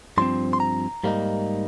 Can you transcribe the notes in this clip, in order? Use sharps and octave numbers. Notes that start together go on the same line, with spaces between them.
G2 F3 C4 C6
C6
A#5
G#2 G3 A#3 D#4